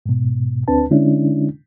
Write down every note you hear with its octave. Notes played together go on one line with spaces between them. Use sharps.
G#2 B2
D2 C4 D4 B4 A5
D3 G#3 C#4 D4 E4